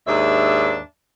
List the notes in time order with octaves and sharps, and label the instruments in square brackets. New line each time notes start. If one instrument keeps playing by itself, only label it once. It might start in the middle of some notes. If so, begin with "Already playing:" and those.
[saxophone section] D#2 G#2 D4 E5